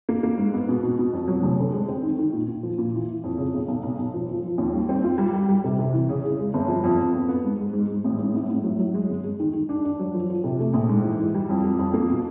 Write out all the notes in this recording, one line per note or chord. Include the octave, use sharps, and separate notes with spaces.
A#3
A#3
G#2
B3
B2
B2
B2
F2
F#3
F1
D3
G#3
C4
D#3
D#3
A#2
A#2
F3
A#2
E3
E3
F2
C#3
B1
B1
B1
B1
F3
F3
F3
D#2
G3
C4
F4
G3
G3
G3
C3
C3
E3
C#3
C#3
G#3
G1
F3
F2
F2
B3
B3
G#2
G#3
G#2
G#2
A1
G#2
A2
A2
F#3
F#3
G#3
G1
G#3
D#3
D#3
D4
D4
F#3
F3
F3
C3
A3
A#1
G#2
E3
E3
G3
F2
G3
F2
A#3
B2